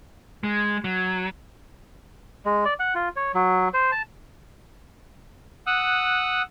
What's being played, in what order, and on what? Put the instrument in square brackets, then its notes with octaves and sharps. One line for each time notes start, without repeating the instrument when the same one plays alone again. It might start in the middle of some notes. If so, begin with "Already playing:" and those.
[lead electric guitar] G#3
F#3
[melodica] G#3
D5
F#5
F4
C#5
F#3
C5
A5
[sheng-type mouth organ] F#5 D#6 E6 F#6